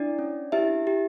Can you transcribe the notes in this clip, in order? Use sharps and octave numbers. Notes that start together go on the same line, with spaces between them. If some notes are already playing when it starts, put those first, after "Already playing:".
Already playing: D4 E4 D5
C#4
E4 G4 E5
G4